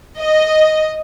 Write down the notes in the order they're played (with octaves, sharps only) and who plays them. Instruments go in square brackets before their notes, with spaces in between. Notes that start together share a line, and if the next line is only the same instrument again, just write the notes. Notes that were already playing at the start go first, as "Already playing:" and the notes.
[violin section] D#5